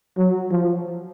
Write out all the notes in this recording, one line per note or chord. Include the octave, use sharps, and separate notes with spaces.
F#3
F3